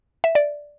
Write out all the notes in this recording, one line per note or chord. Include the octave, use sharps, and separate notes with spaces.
E5
D5